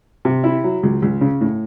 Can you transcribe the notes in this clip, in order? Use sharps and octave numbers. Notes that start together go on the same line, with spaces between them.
C3
E4
F#3
C#2
C#2
C#3
A2